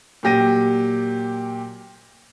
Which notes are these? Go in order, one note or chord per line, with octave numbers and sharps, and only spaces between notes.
A#2 F#3 G4 A#6 D#7